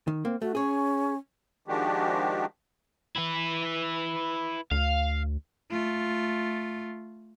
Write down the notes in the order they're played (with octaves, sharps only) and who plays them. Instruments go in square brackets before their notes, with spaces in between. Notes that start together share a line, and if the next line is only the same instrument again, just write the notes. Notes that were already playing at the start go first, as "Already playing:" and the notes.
[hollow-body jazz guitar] D#3
A#3 C4
[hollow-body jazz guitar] A3 [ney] F#4
[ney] C#4 [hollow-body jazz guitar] G#4 C#5
[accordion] D#3 F3 G#3 D4 F#4 G4
[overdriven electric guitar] E4 B4
[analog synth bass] D2 [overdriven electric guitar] F5
[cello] A3 F4